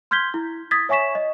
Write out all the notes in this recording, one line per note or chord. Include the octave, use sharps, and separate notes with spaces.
C6 F6 G6 G#6 B6 G7
E4
D#6 G#6 A6 B6
C#5 E5 G#5 C#6 B6 E7
D#5